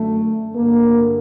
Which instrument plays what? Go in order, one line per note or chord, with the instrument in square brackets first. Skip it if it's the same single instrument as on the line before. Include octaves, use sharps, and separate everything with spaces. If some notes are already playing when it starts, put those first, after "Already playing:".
Already playing: [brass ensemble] F#2 D3 A3
G2 D3 A#3